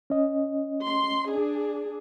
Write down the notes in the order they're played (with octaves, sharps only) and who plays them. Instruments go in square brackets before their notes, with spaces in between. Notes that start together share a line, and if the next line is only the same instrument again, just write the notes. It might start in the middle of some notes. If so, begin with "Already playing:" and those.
[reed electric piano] C#4 D#5
[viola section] C6
D4 G#4